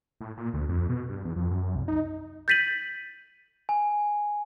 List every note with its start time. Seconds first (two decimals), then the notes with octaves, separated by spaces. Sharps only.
0.21 A2
0.37 A#2
0.54 D2
0.69 F2
0.89 B2
1.09 G2
1.25 E2
1.36 F2
1.51 F#2
1.62 F#2
1.75 C2
1.88 D#4
2.48 G6 A6 B6 D#7 F#7
3.69 G#5